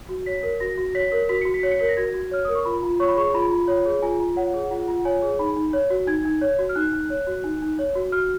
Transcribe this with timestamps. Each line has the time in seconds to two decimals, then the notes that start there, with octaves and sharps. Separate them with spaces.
0.09 F#4
0.26 C#5 B6
0.43 A#4
0.60 F#4 A#6
0.78 F#4
0.95 C#5 B6
1.12 A#4
1.29 F#4 B6
1.41 F#4 C#7
1.54 B6
1.63 C#5
1.71 C#7
1.79 A#4 B6
1.89 A#6
1.97 F#4 G#6
2.14 F#4
2.31 C#5 F6
2.45 A#4 D#6
2.55 C#6
2.65 F4 B5
2.83 F4
3.00 C#5 C#6
3.08 B5
3.17 G#4 C#6
3.34 F4 B5
3.51 F4
3.68 C#5
3.86 G#4
4.02 F4 G#5
4.20 F4
4.36 C#5 F#5
4.54 G#4
4.71 F4 F#5
4.88 F4
5.05 C#5 G#5
5.22 G#4
5.39 D#4 B5
5.56 D#4
5.73 C#5
5.90 F#4
6.07 D#4 G#6
6.25 D#4
6.41 C#5
6.59 F#4
6.69 F6
6.75 D#4 F#6
6.93 D#4
7.10 C#5
7.27 F#4
7.44 D#4
7.62 D#4
7.79 C#5
7.95 F#4
8.12 F#4 F6